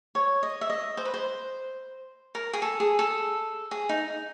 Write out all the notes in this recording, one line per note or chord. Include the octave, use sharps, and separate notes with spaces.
C#5
D#5
E5
D#5
C5
B4
C5
A#4
G#4
A4
G#4
A4
G#4
D#4